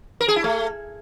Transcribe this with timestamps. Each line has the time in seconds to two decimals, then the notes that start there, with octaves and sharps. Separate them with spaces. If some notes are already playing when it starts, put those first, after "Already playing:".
0.21 A#4
0.28 G#4
0.36 E4
0.44 A3